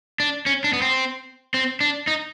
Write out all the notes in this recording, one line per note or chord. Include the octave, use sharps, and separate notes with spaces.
D4
C#4
D4
B3
C4
C4
D4
D#4